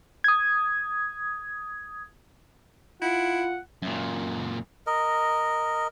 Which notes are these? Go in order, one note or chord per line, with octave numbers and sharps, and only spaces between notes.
D#6 G#6
E4 F4 F#5
F#2 A#2
A#4 D#5